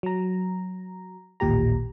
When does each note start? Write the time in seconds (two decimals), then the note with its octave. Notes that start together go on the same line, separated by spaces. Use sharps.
0.03 F#3 A#5
1.40 A1 D#2 A#2 G4 A#5